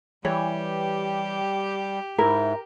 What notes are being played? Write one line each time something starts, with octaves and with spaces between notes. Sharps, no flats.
E3 G3 G4 C#5
G#2 E4 A#4